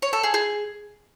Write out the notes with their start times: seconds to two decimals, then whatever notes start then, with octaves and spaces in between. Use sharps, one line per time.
0.02 C#5
0.13 A4
0.23 G#4
0.34 G#4